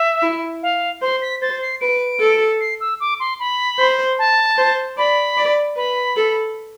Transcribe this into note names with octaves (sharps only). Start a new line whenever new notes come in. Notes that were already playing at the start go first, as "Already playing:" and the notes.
Already playing: E5
E4
F5
C5 C6
B6
C5 A6
C7
B4 D7
A4
C7
E6
D6
C6
B5
C5
A5
C5
D5 B5
D5
B4 B5
A4